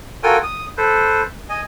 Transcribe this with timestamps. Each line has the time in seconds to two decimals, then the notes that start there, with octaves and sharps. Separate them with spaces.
0.23 F4 F#4 A4 A#4 G5 G#5
0.43 D#6
0.77 A4 B4 C5
1.49 D#5 G#5